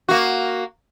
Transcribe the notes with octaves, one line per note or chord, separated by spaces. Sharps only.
A#3 F#4